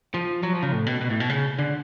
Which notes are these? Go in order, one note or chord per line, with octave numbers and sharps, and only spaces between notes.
F3
F#3
F3
C#3
A2
B2
B2
A2
B2
C#3
D3